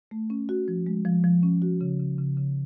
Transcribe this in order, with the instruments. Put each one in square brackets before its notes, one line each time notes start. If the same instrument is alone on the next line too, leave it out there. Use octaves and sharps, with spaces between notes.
[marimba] A3
C#4
F#4
F3
G#3
F3
F3
C#4
F#4
C#3
C#3
C#3
C#3